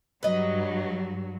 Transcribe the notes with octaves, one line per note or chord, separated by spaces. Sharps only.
G2 F#3 B4 D#5